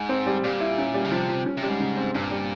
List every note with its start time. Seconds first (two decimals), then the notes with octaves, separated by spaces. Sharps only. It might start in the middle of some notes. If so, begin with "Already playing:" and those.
Already playing: G#2
0.09 C4
0.26 G3
0.44 A#2 G3
0.60 E4
0.78 C#4
0.94 G3
1.04 C#3
1.11 C3 F3
1.29 F3
1.46 C#4
1.57 C3
1.63 G3
1.69 G#2
1.80 C#3
1.97 C4
2.14 G2 A#2
2.31 G3